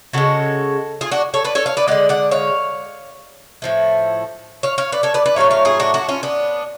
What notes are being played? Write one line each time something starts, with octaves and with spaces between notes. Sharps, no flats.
C#3 G#3 F#4 A4
F4 G#4
D4 F#4
A4 C#5
B4 D5
A4 C#5
C#5 F5
B4 D5
D3 G#3 D5 F#5
D5 F#5
C#5 F5
A2 F3 A3
C#5 F5
C#5 F5
B4 D5
A4 C#5
B4 D5
B4 D5
A2 F#3 A3 C#5 F5
C#5 F5
F4 G#4
D4 F#4
D4 F#4
C#4 F4
B3 D4